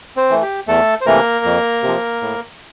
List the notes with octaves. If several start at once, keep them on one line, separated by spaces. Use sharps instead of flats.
C4 C5
E3 A3
G4
E2 A3 A4
C5
C3 E3 A3 A#3 A#4
F2
C3
F3
A2